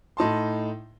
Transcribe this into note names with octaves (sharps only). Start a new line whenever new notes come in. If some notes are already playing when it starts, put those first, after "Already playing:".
A2 D#4 A5 C6